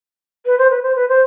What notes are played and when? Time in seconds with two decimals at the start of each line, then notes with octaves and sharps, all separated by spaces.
0.46 B4
0.58 C5
0.70 B4
0.82 C5
0.96 B4
1.08 C5